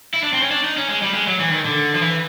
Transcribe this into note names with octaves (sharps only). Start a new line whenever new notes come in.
E4
D4
C4
C#4
D4
D#4
C#4
G#3
G3
G#3
F#3
E3
D#3
D3
F3
E3